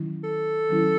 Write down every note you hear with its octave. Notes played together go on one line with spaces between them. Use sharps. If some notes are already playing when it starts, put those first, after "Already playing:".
Already playing: D#3 F#3 C#4 E4
A4
D#3 F#3 C#4 E4